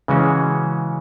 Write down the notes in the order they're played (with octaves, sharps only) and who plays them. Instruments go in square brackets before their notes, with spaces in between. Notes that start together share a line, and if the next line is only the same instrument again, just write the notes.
[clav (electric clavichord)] C#3 E3 G#3 C#4 F#4